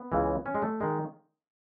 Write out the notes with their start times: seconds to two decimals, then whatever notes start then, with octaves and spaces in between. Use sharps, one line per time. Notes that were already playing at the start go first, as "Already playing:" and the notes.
Already playing: B3
0.12 C#2 C#3 E3
0.46 C#4
0.54 G#3
0.62 A3
0.80 D#3 G#3